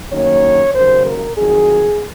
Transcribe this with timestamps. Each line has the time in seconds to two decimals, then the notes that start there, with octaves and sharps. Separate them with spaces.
0.12 F#2 D#3 A#3 C#5
0.75 D#2 C#3 F#3 A#3 C5
1.06 A#4
1.37 F2 D#3 F#3 G#4